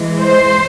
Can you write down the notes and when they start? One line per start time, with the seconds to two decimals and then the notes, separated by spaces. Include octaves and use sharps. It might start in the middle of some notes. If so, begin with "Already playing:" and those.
Already playing: E3 G#3
0.21 C5